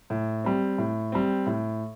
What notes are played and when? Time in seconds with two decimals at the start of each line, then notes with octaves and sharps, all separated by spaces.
0.10 A2
0.44 G3 C4
0.78 A2
1.12 G3 C4
1.46 A2